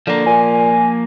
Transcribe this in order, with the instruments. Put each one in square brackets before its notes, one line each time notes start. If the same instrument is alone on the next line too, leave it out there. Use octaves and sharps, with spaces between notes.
[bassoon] D3 [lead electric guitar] F3 A#3
[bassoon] A#2 [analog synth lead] G#5